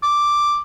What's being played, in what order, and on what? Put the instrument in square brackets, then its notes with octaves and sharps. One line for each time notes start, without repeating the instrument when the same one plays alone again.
[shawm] D6